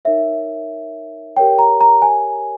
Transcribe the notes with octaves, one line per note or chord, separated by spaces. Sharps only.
D#4 A#4 C#5 E5
G4 A#4 C#5 G5
A#5
A#5
G#5